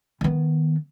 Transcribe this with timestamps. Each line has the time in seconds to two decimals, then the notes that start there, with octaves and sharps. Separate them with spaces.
0.21 D#3 B3